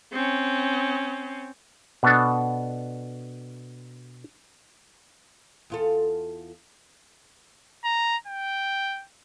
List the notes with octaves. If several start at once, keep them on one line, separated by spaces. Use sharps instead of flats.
C4 C#4
B2 B3 D4 A4
E2 F4 A4
A#5
G5